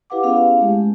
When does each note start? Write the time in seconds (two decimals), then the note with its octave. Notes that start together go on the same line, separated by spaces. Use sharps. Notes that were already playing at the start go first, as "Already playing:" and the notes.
0.10 E4 G4 B4 F5 F#5 D6
0.23 B3 C#4 E4 G#4 F5
0.60 G#3 A3 G4